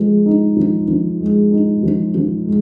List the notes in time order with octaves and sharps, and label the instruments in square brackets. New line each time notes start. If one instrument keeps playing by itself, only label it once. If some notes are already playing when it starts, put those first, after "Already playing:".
Already playing: [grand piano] F3 G#3
D#4
F3
F3
G#3
D#4
F3
F3
G#3